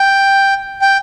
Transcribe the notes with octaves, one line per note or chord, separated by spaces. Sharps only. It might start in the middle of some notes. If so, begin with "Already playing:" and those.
Already playing: G5
G5